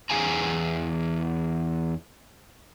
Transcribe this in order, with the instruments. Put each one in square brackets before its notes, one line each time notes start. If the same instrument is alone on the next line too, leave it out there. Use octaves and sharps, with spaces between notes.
[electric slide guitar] E2 G#4 F5 G#5 A#5